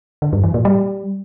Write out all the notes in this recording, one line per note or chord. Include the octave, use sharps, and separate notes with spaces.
D3
G2
E3
A#2
G3